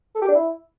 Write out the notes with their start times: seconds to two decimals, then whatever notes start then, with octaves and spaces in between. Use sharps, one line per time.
0.15 A4
0.22 G4
0.28 D4
0.35 E4